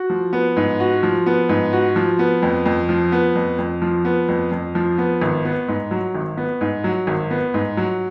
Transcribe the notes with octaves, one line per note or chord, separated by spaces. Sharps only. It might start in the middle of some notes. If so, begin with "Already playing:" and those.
Already playing: F#4
F3
B3
G#2
F#4
F3
B3
G#2
F#4
F3
B3
F2
F2
F3
B3
F2
F2
F3
B3
F2
F2
F3
B3
G#1
B3
G#2
F#3
G#1
B3
G#2
F#3
G#1
B3
G#2
F#3